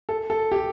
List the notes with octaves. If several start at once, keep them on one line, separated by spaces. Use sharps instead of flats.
A4
A4
G4